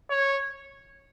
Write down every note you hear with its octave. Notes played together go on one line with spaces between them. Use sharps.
C#5